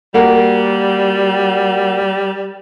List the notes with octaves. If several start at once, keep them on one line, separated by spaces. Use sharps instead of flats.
G3 A#3 F#4 A#4